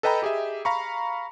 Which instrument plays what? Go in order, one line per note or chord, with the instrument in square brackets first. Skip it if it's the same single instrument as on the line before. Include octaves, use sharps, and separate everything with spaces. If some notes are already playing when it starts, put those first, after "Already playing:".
[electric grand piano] A4 B4 D#5 G5 A#5 B5
G4 G#4 D#5 E5
F5 A#5 B5 C#6